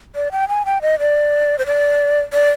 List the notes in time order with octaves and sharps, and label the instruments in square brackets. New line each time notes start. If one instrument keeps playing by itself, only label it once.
[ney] D5
G5
G#5
G5
D#5
D5
C5
D5
D5